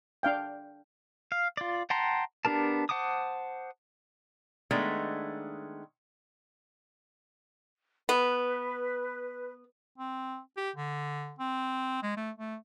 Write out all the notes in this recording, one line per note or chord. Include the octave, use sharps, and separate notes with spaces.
D4 F5 G5
F5
F4 D5
F#5 G5 A5 A#5 C6
B3 D4 G4 A#4 A5
C5 F#5 A5 D6 D#6
D#3 G#3 A3 B3 D4
B3 B4
C4
G4
D3
C4
G#3
A3
A3